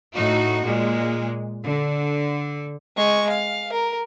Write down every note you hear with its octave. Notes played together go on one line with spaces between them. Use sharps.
A2 D#4 F#4
A#2 G#3
D3
G#3 C#6
F5
A#4